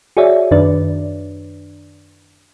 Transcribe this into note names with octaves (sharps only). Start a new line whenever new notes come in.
F#4 G#4 C#5 D5 E5
F#2 D#3 D4 B4 D5